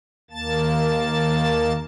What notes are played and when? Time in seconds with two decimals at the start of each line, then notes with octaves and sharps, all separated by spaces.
0.31 D#2 A#3 A5 A6